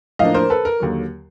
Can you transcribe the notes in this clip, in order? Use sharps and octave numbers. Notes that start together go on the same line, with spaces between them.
A2 F3 A#3 D4 D#5 F5
A#4 C5
A4 B4
A#4
D#2 D3 F#3